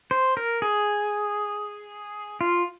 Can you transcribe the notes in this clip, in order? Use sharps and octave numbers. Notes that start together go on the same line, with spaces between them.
C5
A#4
G#4
F4